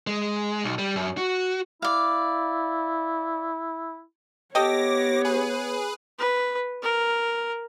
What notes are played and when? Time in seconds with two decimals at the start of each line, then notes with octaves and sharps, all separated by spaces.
0.07 G#3
0.64 B1
0.78 G3
0.96 F#2
1.17 F#4
1.82 E4 D5 F5
4.55 B3 G4 A4 C#5 D#5 G5 D6 A#6
5.25 G#4 B4
6.19 B4
6.82 A#4